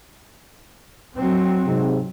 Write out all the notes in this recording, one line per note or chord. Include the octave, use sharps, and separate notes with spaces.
F#3 C4
G#2 C3